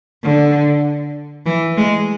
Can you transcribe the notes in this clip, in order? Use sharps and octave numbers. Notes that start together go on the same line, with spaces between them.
D3
E3
G#3